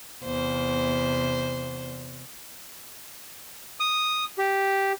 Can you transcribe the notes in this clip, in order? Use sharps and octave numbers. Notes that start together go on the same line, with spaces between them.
E2 C3 C5
D#6
G4